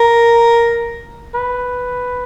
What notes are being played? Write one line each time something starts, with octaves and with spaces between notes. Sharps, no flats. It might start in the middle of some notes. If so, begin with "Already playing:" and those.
Already playing: A#4
B4